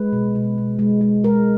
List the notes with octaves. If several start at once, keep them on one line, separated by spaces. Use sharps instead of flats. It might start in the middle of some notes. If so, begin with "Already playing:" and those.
Already playing: G#3 B4
B2
B2
B2
G#3
G#3
G#3 A#4